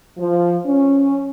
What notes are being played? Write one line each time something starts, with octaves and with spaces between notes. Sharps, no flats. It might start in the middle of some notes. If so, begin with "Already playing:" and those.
F3
C#4